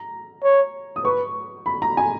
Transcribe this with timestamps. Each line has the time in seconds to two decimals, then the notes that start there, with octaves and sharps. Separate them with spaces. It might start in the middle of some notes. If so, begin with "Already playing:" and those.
Already playing: A#5
0.43 C#5
0.96 D#6
1.04 B4 C#6
1.66 B5
1.82 A#5
1.97 G#5